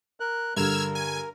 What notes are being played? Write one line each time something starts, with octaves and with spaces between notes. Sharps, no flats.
A#4 F#6
G2 D3 A#4 E6 F6 G#6
G#5